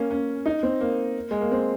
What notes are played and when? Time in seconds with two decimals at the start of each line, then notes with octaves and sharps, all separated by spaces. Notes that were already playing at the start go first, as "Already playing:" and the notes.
Already playing: A#3 C#4
0.11 C#4
0.46 D#4
0.63 C4
0.81 A#3
1.31 G#3
1.41 A#3
1.52 C4